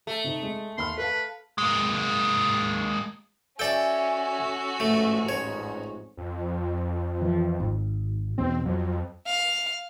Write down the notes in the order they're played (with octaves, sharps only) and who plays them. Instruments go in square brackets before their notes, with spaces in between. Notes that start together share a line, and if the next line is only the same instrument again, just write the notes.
[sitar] A3
[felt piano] C3 D#4
G#3
[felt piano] D#2 B5 F6 [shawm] C6
[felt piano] A4 F5 A5 [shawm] B4
[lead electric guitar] G#3 A#3
[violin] C#4 F#4 [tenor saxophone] A4 [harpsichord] D5 G5 [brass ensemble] E5 G#5
[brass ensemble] A1 F2 G#2 [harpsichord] A3
[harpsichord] C#5
[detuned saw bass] F2
[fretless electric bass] E3 F3
G#1
[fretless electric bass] B1 E2 B2 [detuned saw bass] C4
[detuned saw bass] F2 [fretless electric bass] F#3
[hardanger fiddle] F5